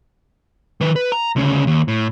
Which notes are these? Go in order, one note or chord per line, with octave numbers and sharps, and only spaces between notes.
D#3 B4
B4
A#5
D2 C#3
D#2
A2